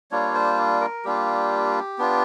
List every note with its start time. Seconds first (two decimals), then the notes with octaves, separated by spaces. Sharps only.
0.11 G3 A#3 D4 F4 C#5
0.34 C5
0.81 A#4
1.04 G3 A#3 D4 F4 G4
1.98 B3 D4 F4